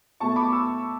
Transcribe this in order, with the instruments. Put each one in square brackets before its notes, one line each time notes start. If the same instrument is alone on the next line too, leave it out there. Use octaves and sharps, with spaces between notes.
[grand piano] B2 A3 E4 A5 C#6
B5 D6
C#6 E6